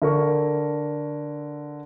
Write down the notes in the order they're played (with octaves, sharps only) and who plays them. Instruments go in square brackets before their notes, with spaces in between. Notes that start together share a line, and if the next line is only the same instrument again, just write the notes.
[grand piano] D3 A#4 C#6